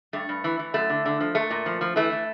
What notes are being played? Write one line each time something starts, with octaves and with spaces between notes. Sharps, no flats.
G2 A3
G2
E3
E3
F#2 A3
D3
D3
F3
A#2 A3
A#2
F3
F3
E3 A3
E3